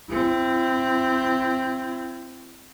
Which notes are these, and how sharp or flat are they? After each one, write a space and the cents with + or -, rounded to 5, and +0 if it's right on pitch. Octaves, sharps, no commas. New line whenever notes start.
C4 +0 E4 +40